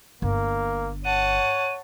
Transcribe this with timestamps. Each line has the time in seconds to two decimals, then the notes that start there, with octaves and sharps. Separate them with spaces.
0.22 G1 A#3
1.05 C#5 F#5 A5 D#7